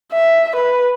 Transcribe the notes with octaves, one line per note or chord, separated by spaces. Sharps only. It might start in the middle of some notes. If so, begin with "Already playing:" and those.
E5
B4